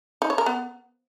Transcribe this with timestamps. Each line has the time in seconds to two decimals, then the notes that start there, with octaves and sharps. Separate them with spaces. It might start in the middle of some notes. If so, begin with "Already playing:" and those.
0.22 D#4
0.30 C#5
0.38 A#4
0.46 B3